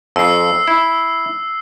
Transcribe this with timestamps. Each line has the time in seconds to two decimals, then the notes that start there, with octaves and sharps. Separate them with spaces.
0.16 F2 E6 C7
0.68 E4